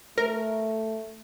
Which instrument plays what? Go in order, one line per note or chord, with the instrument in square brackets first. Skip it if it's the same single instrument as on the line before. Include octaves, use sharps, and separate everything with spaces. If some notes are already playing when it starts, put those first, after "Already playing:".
[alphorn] A3 [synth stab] A#4